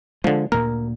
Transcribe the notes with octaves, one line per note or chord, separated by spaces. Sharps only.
D3 F3 G#3
D2 A#2 A#3 A#4